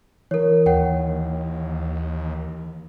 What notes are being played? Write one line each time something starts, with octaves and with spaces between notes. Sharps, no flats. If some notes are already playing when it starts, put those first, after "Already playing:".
E3 A#4 C#5
D#2 C#5 F#5 G5